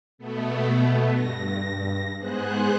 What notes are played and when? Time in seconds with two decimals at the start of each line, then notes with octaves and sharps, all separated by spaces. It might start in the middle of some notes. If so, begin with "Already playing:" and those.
0.18 B2 A3 B3
1.13 G2 A#6
2.19 G#2 B3 G#4 C5 F#6